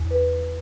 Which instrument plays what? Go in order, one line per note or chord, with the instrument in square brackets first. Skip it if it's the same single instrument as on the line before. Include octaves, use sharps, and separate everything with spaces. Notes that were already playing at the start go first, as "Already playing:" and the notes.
Already playing: [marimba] E2
B4